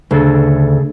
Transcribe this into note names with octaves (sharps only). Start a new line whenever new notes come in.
D2 C#3 G#4 A4